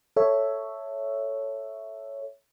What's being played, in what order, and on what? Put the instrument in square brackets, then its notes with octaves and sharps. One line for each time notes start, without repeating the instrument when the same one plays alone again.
[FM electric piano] A4 C#5 E5